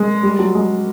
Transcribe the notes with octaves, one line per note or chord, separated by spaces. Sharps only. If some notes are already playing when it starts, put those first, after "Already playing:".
Already playing: G#3
G3
F#3
G#3